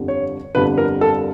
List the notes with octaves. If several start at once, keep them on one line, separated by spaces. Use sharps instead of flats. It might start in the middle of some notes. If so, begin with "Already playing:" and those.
Already playing: G1 F2 D3 G3
C#5
G1 F2 D3 G3 B4
A#4
A4